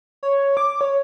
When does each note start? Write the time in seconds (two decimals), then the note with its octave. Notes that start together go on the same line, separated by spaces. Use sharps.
0.23 C#5
0.57 D6
0.81 C#5